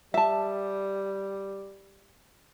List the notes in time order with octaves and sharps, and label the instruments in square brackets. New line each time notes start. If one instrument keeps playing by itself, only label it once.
[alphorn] G3 [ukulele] E5 A5